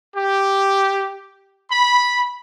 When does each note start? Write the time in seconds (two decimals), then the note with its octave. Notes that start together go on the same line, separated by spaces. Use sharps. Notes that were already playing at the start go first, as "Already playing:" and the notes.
0.16 G4
1.70 B5